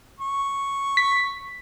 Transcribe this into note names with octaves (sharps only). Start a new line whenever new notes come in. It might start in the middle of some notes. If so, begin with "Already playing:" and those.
C#6
B6